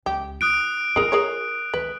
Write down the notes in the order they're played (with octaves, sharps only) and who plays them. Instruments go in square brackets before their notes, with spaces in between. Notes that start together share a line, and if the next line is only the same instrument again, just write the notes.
[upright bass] C#2 [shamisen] G4
[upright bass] F4 [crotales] D#6 F#6 D7
[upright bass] G2 F4 [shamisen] G#4 A#4
[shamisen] G#4 A#4 C#5
[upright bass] C#2 D#3 [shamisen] B4